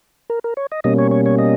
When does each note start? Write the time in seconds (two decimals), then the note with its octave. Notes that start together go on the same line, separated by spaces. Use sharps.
0.30 A#4
0.44 A#4
0.57 C#5
0.72 D#5
0.84 B2 G3 A#3 C#4 D#5
0.99 C#5
1.11 C#5
1.26 C#5
1.39 D#5